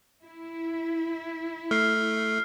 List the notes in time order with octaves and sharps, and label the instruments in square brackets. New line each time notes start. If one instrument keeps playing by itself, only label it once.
[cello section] E4
[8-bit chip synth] A3 [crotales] F6 C7